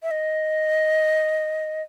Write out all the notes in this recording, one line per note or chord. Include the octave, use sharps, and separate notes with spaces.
E5
D#5